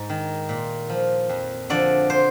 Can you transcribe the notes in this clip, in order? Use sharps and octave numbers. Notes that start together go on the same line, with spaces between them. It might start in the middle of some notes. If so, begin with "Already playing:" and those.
Already playing: G#2
D#3
A#2
F3
F2
D3 F3 D5
C5